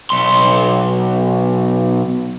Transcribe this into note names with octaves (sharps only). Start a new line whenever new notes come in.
B1 C6